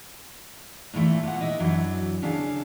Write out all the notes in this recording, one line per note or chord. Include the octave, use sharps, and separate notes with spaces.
G2 A#2 E3 G#3 A3
A#2 F#5
E4 D#5
F#2 E3 F#3 D4
C#3 C#4 D4 A4 F5